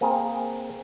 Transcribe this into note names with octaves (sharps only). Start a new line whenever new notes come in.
A#3 C4 G#4 A#4